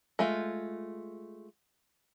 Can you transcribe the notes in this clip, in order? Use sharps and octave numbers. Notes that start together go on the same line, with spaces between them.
G#3 A3 F4